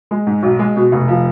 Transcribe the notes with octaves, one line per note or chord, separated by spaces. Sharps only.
G#3
G#2
B1
G#3
B2
F1
F3